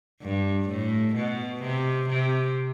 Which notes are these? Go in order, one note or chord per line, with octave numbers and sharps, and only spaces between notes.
G2
A2
B2
C3
C3